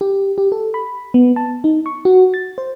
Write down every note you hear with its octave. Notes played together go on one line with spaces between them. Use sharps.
G4
G4
A4
B5
B3
A5
D#4
C#6
F#4
A6
C5